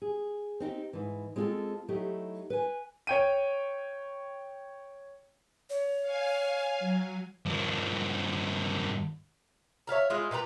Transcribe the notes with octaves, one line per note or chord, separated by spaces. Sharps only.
G#4
C4 D#4 E4 G4
G#2 E3
G#3 C4 F4 F#4 A4
F#3 A3 D#4 E4 G4
B4 G#5
C#5 G5 D#7
C#5
F5 G#5
F#3
G2 F3
C#5 E5 F5 A#5
G#3 E4 F4
A#2 G4 B4 A#5